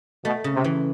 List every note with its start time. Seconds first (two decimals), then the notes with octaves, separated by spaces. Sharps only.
0.25 B2 A3
0.44 C#3
0.54 C3
0.64 E3